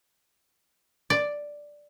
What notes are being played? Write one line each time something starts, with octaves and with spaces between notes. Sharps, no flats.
D5